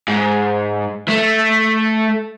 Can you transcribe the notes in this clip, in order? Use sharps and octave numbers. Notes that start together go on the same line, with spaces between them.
G#2
A3